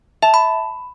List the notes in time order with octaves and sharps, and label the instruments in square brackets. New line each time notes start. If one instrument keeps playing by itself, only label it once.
[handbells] E5 [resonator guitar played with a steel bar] A5
[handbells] B5